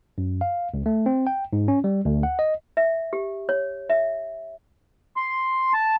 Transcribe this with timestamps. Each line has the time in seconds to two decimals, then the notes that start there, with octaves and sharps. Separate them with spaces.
0.18 F#2
0.41 F5
0.74 C#2
0.86 A3
1.06 C4
1.27 G5
1.53 G#2
1.68 C#4
1.84 G3
2.05 D2
2.23 F#5
2.39 D#5
2.77 E5
3.13 G4
3.49 C#5
3.90 E5
5.17 C6
5.73 A5